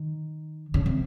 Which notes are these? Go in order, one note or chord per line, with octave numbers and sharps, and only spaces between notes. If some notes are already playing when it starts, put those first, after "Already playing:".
Already playing: D#3
C#3
C3